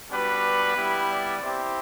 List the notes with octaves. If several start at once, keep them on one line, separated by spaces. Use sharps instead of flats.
G3 B3 D4 F#4 B4
G3 B3 E4 G4
D5
C4 E4 G4